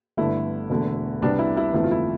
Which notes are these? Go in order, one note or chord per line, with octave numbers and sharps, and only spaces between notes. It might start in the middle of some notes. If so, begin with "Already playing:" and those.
G1 G2 D3 A3 E4
E1 E2 D3 A3
C2 C3 G3 B3 D4
E4
E4
G1 F2 E3 A3 C4 E4
F4
E4